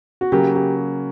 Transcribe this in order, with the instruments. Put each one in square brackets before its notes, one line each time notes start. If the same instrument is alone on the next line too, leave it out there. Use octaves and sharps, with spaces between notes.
[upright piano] F#4
[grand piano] C#3 F#3 A#3 [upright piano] G4
[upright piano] G4